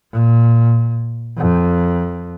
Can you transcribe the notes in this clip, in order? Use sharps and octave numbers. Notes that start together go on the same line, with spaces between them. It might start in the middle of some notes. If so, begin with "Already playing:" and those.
A#2
F2